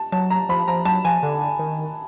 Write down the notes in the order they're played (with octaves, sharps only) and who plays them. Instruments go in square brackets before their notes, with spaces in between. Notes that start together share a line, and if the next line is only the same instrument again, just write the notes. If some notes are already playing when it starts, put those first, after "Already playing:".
Already playing: [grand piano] A5
[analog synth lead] F#3 [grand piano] A5
[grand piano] A#5
[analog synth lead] F3 [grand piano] B5
[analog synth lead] F3 [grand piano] A#5
[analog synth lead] F#3 [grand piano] A5
[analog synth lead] F3 [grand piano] G#5
[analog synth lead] D3
D#3